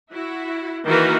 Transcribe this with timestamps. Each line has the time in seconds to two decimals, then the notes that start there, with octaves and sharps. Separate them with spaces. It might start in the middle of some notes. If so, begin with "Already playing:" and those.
0.13 E4 F#4
0.85 D#3 E3 A#3 F#4 A#4 B4